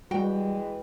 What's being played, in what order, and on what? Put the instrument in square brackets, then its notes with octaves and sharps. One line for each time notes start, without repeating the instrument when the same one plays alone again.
[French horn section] E3 G#3 B4 [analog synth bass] G3 [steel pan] F#4 [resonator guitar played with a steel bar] G5